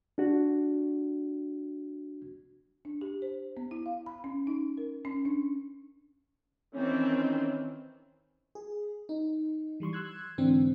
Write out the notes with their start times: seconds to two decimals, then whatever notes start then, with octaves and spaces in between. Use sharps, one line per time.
0.18 D4 F#4
2.85 D4
3.01 G4
3.22 C5
3.57 B3
3.71 E4
3.86 F5
4.06 B5
4.24 C#4
4.47 D#4
4.78 A#4
5.05 C#4
5.25 D4
6.74 D#3 E3 C4 C#4
8.55 G#4
9.09 D#4
9.80 E3 G3 C6 C#6
9.93 C6 E6 F#6 G#6
10.38 G#2 D3 E3 C4 D4